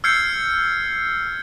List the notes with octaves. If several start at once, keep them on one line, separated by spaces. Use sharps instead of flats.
E6 F6 G6 G#6 C7 C#7